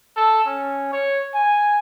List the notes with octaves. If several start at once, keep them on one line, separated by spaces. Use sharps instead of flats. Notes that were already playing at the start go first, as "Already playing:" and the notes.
A4
C#4
C#5
G#5